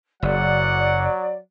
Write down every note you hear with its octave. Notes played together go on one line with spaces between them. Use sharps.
F#1 F#3 D5 F#5